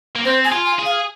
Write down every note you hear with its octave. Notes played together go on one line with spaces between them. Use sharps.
A#3
C4 C5
G#5
F4
G#5
G#4
F5